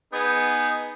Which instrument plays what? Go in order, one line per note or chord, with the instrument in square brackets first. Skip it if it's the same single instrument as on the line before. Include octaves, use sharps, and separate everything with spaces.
[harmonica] B3 D#4 G#4